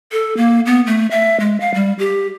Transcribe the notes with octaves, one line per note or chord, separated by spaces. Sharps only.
A4
A#3
B3
A3
E5
G#3
F5
G3
G4